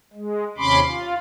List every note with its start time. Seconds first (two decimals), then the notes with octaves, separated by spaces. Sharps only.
0.13 G#3
0.58 D#2 C3 C#4 B5 C6 D6
0.87 F4